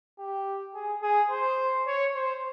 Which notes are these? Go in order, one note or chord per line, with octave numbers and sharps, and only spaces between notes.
G4
G#4
G#4
C5
C#5
C5